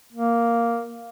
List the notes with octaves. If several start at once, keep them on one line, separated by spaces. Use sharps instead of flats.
A#3